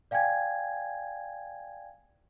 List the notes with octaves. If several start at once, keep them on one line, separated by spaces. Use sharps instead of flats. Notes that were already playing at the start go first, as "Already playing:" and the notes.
D5 F5 G5 G#5 G#6